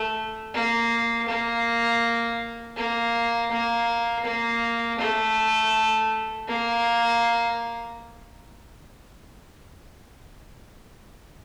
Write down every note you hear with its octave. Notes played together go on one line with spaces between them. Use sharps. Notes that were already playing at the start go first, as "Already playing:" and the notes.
Already playing: A3
A#3
A#3
A#3
A#3
A#3
A3
A#3